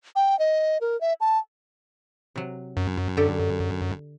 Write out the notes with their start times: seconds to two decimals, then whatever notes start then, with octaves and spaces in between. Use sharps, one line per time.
0.16 G5
0.39 D#5
0.81 A#4
1.01 E5
1.21 A5
2.36 C3 F#3
2.77 F#2
3.17 D3 G4 A4